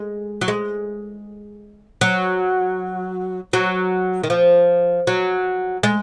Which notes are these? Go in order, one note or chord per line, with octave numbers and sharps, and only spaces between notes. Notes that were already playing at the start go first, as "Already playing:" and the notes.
Already playing: G#3
F#3
G#3
F#3
F#3
D#3
F3
F#3
G#3